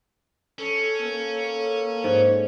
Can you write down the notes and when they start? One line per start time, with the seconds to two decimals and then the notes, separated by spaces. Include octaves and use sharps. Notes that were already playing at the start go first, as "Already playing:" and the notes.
0.59 C#4 A4
1.01 A#3 A4
2.04 G#2